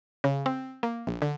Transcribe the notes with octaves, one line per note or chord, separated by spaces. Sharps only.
C#3
C4
A#3
A#1
D3